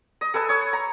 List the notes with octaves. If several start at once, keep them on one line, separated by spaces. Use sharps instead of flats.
D#5
A4 B4 G#5 E6
C#5 D#6
A#5